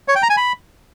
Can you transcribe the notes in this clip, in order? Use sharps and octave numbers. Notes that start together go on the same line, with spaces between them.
C#5
G5
A#5
G#5
B5